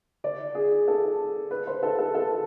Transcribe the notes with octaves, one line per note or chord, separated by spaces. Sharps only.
D5
G#4
A4
B4
C5
A4
A4
A4